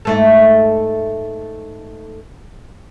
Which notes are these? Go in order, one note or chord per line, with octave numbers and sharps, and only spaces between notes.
G#2 A3 A4